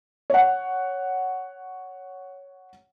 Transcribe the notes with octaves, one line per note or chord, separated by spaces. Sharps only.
C#5 F#5